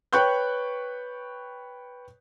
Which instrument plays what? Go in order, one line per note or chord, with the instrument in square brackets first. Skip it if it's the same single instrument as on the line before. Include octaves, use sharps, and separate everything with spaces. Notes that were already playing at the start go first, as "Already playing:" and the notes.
[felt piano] B4 C#5 G5 C#6 F#6 G6